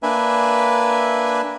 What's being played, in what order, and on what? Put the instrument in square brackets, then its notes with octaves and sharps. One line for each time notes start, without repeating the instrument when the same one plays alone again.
[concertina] A#3 D4 B4 E5 G#5